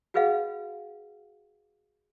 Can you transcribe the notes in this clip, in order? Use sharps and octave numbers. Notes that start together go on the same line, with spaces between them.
F#4 G#4 B4 D#5 F5 F#5